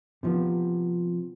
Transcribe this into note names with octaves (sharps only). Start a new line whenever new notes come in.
C3 F3 B3